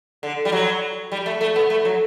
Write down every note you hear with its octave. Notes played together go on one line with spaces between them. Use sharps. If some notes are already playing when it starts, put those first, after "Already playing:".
D3
G3
F#3
G3
A3
A3
B3
A3
F#3